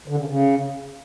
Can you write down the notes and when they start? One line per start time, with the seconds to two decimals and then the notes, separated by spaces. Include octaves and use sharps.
0.08 D3
0.18 C#3
0.28 C#3